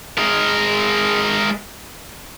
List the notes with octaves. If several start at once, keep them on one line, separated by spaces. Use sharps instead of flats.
G#3 A#4